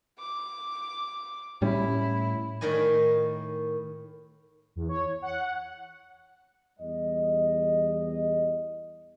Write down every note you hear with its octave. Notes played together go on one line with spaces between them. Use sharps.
D6
A2 G3 C#4 E4
A2 D#3 A#4 D#5 G#5
E2
C#5
F#5
E2 G3 D#5